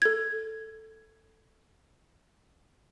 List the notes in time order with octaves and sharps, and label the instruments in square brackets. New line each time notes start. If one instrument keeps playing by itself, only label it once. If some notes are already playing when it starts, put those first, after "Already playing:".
[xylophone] A4 G#6